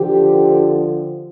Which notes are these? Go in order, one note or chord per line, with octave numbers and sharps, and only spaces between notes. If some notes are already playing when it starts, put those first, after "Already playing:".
Already playing: D3 F3 G4